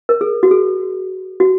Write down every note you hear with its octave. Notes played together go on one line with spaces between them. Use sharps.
A#4
G#4
F#4
G#4
F#4